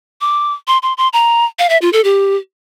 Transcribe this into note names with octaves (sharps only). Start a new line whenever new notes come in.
D6
C6
C6
C6
A#5
F5
E5
F4
A4
G4